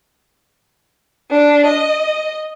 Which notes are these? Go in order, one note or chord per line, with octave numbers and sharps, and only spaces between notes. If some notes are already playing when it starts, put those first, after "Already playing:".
D4
D#5